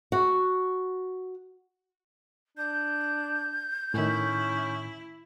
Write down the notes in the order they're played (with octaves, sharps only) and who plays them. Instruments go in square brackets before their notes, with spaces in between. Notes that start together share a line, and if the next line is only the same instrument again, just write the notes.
[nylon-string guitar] F#4
[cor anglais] D4 [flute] G6
[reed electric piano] A2 D#3 [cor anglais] C#4 [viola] E4